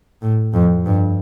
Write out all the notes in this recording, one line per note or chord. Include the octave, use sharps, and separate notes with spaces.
A2
F2
G2